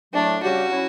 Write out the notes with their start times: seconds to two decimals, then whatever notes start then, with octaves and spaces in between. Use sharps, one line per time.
0.14 A2 F#3 A3 D4
0.43 C#3 G3 C#4 F#4 G4
0.71 F#3 C#4 E4